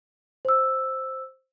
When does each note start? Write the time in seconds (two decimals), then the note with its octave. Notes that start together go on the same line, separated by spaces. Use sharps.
0.45 C5 E6